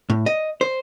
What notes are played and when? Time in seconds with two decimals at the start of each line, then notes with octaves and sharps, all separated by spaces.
0.10 A2
0.26 D#5
0.61 C5